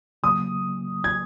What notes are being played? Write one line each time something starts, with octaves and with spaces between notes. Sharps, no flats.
C#3 F#3 A#3 D#6
G#6